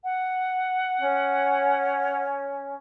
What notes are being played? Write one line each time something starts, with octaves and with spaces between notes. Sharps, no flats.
F#5
C#4